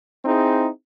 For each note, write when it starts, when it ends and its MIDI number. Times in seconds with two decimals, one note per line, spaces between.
0.25 0.68 60
0.25 0.68 63
0.25 0.68 64
0.25 0.68 68